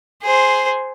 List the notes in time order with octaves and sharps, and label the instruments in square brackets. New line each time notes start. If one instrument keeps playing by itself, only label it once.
[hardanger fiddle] G#4 C5